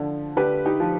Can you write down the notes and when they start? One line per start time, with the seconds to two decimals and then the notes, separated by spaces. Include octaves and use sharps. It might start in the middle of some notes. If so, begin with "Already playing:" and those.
Already playing: D3 F3
0.37 D3 G4 B4
0.65 D#4 G4
0.80 F3